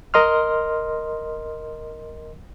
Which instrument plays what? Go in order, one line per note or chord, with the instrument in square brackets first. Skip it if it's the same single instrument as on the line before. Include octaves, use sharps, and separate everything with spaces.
[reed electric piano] A#4 D#5 C6 F6